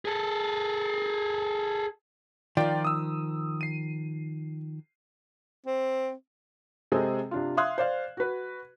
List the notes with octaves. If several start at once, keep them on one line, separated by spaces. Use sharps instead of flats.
G#4 A4
D#3 F3 F4 D5 G5
D#6 E6
C7 D#7
C4
C3 G#3 C4 G#4 A4
C3 D4 F4
E5 F5 C6 D#6 F#6 G#6
C5 D5 F5
F#4 B4